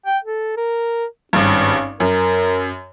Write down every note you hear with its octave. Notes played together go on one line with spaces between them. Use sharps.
G5
A4
A#4
G#1 G2 C#4
F#2 A#4